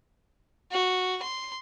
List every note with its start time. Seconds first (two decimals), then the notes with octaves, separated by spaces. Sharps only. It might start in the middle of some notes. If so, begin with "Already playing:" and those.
0.71 F#4
1.22 C6